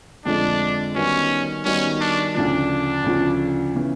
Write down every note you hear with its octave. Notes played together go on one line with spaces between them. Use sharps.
F2 D3 F3 G#3 D4
D#3 G3 B3 C#4 D#4 F#4
D#3 G3 B3 C#4 D#4 F#4
D4
D2 C#3 F3 D4
D2 C#3 F3
C#3 E3